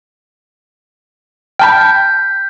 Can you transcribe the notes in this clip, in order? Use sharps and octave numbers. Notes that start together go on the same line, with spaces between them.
G5 A5 B5 F6 G6 B6